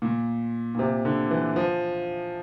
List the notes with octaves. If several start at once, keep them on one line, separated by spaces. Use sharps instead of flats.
A#2
A#2
C3
D3
E3
F3